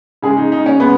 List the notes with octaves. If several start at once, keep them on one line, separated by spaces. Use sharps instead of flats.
C#3 G#3 G#4
D#4
D#4
C#4
C#3 G#3 B3